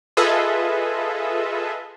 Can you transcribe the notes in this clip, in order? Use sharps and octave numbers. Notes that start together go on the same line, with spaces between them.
F4 G#4 A4 B4 D#5 E5